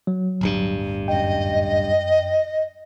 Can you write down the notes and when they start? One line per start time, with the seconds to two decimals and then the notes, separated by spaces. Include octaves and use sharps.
0.07 F#3
0.41 D1 G1 G2
1.08 F#2 D#5 G5